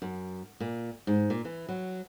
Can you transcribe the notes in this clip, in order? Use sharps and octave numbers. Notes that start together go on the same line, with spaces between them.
F#2
A#2
G#2
A#2
E3
F#3